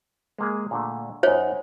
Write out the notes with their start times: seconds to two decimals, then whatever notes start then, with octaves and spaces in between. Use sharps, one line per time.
0.38 G#3 A#3 G#4
0.71 A#2 D3 A3
1.23 F#2 D#4 C5 C#5